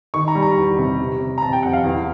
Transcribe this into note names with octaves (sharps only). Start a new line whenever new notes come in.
D#3 C#6
A#5
G3
A#5
E2
C3
C3
C3
A#5
C3 A5
G5
F2 F#5
F5
E2